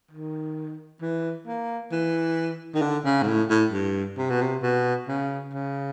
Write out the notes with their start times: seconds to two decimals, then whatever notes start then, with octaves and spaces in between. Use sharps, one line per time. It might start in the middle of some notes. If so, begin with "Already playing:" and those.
0.11 D#3
1.02 E3
1.47 A#3
1.92 E3
2.75 D#3
2.82 D3
3.05 C#3
3.23 G#2
3.27 A2
3.50 A2
3.72 G2
4.18 C3
4.30 B2
4.42 C3
4.62 B2
5.08 C#3
5.53 C#3